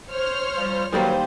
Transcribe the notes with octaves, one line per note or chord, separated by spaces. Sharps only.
C5 C#5 F6
F3 G3
D#3 F#3 G3 A#3 B4 C5